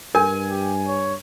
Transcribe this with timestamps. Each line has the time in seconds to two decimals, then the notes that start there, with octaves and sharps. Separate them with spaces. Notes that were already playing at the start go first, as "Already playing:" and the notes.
0.15 G2 A#4 G#5
0.48 G4
0.88 C#5